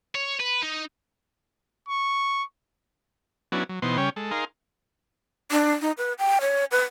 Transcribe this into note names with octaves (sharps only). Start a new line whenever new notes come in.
C#5
B4
D#4
C#6
F#3 B3 C#4 D4 E4 F#4
F#3
B2 E3 B3 D#4 C5 C6
C#3 G3 C#4 C#5 G5
G#3 A4
D#4 G#4 A#4 F5 C6
D4
D#4
B4
G5
C#5
B4